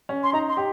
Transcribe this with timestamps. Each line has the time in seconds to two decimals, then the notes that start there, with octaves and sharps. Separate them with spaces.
0.09 C#4
0.23 C6
0.33 D#4 A#5
0.49 C6
0.57 G4